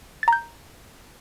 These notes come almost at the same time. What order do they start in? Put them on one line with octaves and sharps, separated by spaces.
A6 A#5 G6